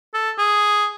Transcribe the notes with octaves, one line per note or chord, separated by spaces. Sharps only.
A4
G#4